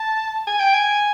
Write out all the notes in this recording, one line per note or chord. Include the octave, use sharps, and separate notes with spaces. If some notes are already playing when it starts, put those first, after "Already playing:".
Already playing: A5
G#5
G5
G#5